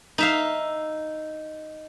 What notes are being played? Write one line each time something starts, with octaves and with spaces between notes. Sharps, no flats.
D#4 E5 F5